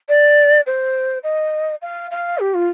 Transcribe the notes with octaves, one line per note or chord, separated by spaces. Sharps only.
D5
C5
D#5
F5
F5
G4
F4